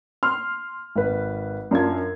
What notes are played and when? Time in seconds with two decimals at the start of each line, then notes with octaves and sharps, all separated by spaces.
0.23 C6 F6
0.95 G#1 B4
1.71 F#2 D4 F4 G#6